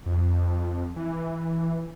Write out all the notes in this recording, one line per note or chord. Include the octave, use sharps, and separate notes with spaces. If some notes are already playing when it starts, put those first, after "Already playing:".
F2
E3